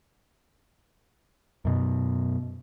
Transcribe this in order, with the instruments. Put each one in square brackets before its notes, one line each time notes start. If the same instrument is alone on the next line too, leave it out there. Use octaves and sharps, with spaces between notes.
[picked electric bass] F#2 B2